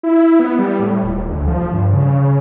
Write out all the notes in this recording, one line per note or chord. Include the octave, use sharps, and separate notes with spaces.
E4
B3
G3
A2
D#1
D2
F3
G2
C#3